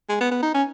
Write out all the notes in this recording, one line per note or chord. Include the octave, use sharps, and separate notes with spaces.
G#3
B3
B3
D#4
C#4